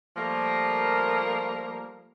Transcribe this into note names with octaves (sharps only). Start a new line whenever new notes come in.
F3 G3 A3 A#3